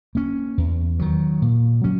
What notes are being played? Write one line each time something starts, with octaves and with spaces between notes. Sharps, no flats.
A#3 C#4
E2
D#3 F#3
A#2
F#3 C#4